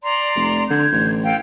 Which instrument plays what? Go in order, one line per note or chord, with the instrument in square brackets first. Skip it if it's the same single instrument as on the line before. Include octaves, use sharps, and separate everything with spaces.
[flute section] D5 A#5 C6
[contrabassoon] F1
[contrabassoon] D3 [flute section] G6 G#6
[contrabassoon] A1
[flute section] A4 F5 G5